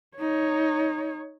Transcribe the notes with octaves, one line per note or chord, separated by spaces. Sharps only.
D#4 C#5